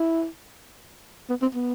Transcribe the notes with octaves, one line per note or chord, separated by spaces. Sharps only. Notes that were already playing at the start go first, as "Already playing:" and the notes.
Already playing: E4
B3
C4
B3